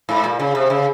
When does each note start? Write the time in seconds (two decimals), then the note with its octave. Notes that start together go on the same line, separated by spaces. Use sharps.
0.09 G#2
0.24 A#2
0.40 C#3
0.55 C3
0.70 C#3